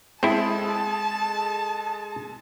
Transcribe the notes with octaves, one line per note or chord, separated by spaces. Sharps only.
G#3 C4 E4 G#4 A4 A5